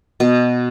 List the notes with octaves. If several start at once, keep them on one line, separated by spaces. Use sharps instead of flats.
B2